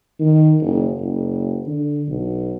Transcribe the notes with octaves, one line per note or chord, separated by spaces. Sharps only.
D#3
F#1
F#1
D3
B1